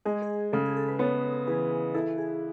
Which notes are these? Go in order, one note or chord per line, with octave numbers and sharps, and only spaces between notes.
G#3 G#4
G#4
C#3 A4
G#4
A4
B4
B3 A4 C#5
E3 G#4 B4
E4 A4
G#4